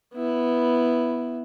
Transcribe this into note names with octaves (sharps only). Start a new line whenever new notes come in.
B3 E4